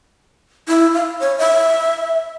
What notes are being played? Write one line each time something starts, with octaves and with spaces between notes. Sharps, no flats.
E4
F5
C#5
E5